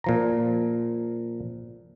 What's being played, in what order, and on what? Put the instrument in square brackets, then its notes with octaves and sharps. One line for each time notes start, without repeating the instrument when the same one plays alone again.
[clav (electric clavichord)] A#2 F3 A#5